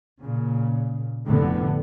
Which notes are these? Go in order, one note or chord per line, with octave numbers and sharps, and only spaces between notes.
A#2 C#3
F1 A2 D3 B3